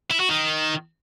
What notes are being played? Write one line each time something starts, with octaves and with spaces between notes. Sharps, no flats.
E4
F#4
D#3